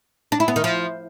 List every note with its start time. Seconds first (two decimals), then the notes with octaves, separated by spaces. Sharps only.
0.32 D4
0.40 E4
0.48 B3
0.56 D#3
0.64 F3